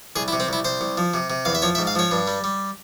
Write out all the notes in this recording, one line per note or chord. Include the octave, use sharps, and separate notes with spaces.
C2 G#4
E4
C3
C4
C2 E4
C2 C5
C2
F3
C3
C3
E2 F5
E5
F3 C#5
E5
G#2
F5
F3 C#5
G2
G3
G3